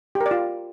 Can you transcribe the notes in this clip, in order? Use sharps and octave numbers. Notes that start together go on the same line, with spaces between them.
G4
A#4
D5
F4